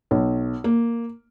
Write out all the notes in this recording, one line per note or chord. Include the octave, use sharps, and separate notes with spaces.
B1
A#3